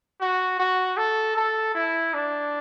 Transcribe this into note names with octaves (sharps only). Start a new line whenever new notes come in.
F#4
F#4
A4
A4
E4
D4